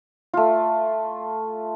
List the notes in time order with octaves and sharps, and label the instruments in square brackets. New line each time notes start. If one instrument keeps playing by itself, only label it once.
[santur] A3 F4